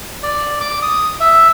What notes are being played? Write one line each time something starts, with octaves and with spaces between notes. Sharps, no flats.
D5
D6
D#6
E5